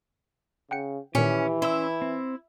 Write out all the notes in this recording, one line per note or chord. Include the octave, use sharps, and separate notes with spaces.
C#3 F#5 G5 C#7
A#2 D#3 E3 C#4 G4
C#4 E4 C6 E6
C4